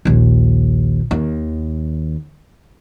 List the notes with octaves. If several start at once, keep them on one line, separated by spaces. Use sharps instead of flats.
A#1 D#2
D#2